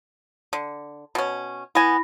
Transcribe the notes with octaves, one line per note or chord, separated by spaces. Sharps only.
D3
B2 C#4
B3 E4 G#5 B5 A#6